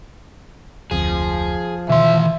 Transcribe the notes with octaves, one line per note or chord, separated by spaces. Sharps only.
F1 D2 F3 C4 G#4
B2 D#3 E3 E5 C6